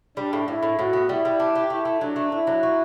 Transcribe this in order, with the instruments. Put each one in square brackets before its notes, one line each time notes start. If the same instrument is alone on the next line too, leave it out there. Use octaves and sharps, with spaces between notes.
[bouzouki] G3 [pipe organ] D4
[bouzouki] A2
[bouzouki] A2 [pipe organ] E4
[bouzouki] A2
[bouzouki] A2 [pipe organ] F#4
[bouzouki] B3
[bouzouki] G3 [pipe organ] E4
[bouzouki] G3
D4
G4
[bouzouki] A3 [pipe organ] E4
[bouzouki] A3
[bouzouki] F#3 [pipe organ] D4
[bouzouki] A3
[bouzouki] D4 [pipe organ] E4
[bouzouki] F#3
F#4